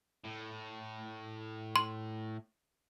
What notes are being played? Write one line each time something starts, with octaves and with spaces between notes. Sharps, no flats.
A2
C6